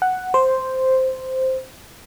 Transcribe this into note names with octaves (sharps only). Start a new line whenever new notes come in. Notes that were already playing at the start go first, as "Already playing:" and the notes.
F#5
C5